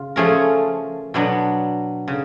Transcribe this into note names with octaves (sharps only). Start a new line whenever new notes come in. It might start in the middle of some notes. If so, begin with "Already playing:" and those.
Already playing: C#3 F4
F3 A3 C#4 G#4 A#4
B2 F#3 B3 D4
C#3